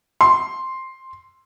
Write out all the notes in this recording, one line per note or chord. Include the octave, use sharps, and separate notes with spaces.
C6